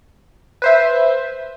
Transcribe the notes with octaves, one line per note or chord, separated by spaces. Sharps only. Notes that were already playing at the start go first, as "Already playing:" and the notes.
B4 C5 E5